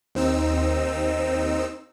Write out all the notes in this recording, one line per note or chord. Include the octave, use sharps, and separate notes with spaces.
D#2 C4 D#4 E6